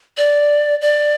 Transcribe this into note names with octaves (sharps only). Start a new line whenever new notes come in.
D5
D5